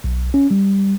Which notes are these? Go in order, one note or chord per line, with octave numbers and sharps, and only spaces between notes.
B1
C#4
G3